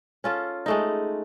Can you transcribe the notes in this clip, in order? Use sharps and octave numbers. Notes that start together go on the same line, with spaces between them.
C#4 F4 A4
G#3 A3 D#4